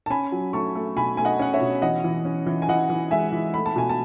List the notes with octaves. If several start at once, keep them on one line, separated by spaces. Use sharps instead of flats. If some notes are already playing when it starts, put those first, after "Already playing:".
A5
C#4 G#5 B5
F#3
A3 A5 C#6
A3
B2 G#5 B5
A3 G#5
D#5 F#5
C#4 F#5
C#5 E5
B2
E3 D#5 F#5
E3
C#4
E3
G#5
E3 D#5 F#5
E3
G#3 E5 G#5
E3
A3 B5
A5
B2 G#5
A5